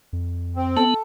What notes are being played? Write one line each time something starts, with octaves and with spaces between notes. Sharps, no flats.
F2
C4
B3 A4